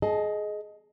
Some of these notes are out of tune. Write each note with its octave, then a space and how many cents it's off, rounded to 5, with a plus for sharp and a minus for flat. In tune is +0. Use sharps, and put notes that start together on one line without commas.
G#4 +25 D#5 +0 A5 -5